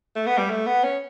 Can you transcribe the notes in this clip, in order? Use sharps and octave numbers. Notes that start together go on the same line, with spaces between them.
A3
B3
G3
A3
B3
C#4